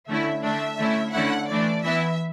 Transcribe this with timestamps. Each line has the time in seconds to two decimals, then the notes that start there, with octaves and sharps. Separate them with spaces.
0.08 D3 A3 C#4 E4 E5
0.43 D3 A3 D4 E5
0.78 D3 A3 C#4 E4
1.14 D3 A3 C#4 E4 F#5
1.50 E3 A3 D4 D5
1.84 E3 B3 E4 E5